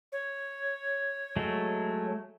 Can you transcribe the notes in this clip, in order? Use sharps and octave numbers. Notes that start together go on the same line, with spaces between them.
C#5
F#3 G#3 A3